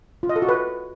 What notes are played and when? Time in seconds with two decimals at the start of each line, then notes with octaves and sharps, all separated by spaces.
0.23 F4
0.29 D#5
0.36 A4
0.42 F#4
0.49 B4